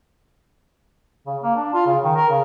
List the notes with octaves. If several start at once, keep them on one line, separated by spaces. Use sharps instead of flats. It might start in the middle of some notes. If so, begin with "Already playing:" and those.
C#3
A#3
D4
F4
C#3
D#3
A#4
C#3